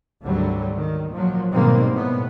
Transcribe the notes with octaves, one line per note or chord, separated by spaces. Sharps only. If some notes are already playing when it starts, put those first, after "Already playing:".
G#1 D2 D3 F#3 G3
D#3
A#2 F3 F#3
G#2 B2 D#3 G3 A#3 C4
A2 B3